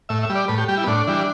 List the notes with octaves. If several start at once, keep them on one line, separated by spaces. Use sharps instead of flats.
A2 E5
E5
G3
D5
A2 B4
G4
G3 G4
E4
B3
A2 D4
E3 G3